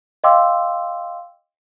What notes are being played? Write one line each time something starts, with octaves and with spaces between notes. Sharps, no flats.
D#5 F5 G5 C6 D6 E6